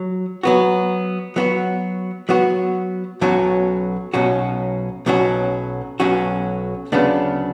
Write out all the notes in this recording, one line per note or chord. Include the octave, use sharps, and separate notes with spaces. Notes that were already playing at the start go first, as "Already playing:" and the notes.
Already playing: F#3
F#3 B3 F#4
F#3 B3 F#4
F#3 B3 F#4
B1 B2 F#3 C#4 F#4
B1 B2 F#3 C#4 F#4
B1 B2 F#3 C#4 F#4
B1 B2 F#3 C#4 F#4
D2 C#3 F#3 B3 D4